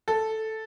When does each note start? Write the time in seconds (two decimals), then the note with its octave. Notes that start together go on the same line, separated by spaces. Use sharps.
0.08 A4